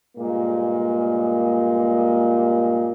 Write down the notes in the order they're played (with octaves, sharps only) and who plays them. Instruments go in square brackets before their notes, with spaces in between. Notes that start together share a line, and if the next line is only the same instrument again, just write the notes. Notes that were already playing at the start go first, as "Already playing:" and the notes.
[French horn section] G2 A#2 G#3 A#3